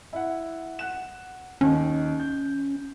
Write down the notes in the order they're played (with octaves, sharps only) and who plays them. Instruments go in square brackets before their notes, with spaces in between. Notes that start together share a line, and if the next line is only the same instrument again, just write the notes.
[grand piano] E4 F#5
F#5 F#6 E7
[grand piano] D#2 D#3 [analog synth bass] C#4
[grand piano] G6